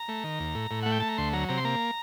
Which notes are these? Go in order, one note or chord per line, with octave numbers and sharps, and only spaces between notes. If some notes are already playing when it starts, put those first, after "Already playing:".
Already playing: A#5
A3
D#3
D#2
A2
A2
A3 F#5
G5
A3 A5
A#5
D2 C6
F#3 A#5
C3 A#5
C6
A#3 A#5